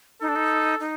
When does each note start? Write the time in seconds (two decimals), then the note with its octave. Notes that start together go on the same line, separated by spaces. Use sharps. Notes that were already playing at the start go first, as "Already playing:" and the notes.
0.21 D#4 A4
0.28 D4
0.36 D#4
0.80 D#4